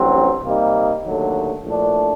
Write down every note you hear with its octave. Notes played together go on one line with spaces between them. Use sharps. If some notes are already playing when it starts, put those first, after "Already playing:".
Already playing: A1 G2 F#3 C4
C3 G3 A#3 D#4
D#2 D3 F#3 A3
A#1 A2 A3 D4